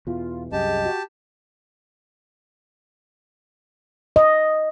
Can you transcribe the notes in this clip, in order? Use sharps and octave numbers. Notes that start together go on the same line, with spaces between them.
E2 B2 E3 F4
C2 F#2 G4 G#4 D#5 A5
F#4
D#5